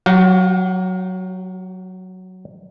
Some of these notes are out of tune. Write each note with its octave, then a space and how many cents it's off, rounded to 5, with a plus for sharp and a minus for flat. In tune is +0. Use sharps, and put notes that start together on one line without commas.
F#3 +0 G4 -40 F5 +30